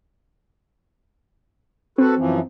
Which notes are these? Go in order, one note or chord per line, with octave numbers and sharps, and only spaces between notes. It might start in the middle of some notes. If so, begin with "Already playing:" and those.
C4 F#4 A4 B4
F#2 E3 F3